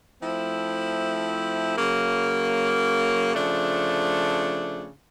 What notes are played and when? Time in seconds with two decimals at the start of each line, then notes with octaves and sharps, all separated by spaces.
0.21 F3 A3 C4 E4
1.77 C#3 F#3 A#3
3.34 C#3 F3 A3 D4